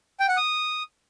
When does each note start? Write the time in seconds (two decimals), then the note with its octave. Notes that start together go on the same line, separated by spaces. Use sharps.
0.20 G5
0.29 F#5
0.37 D#6